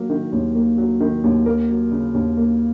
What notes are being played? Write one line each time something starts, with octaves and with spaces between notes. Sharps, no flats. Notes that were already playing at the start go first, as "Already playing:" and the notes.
Already playing: F#3 A#3
D#3
D#2
A#3
F#3
D#3
D#2
A#3 A#4
F#3
C#3
D#2
A#3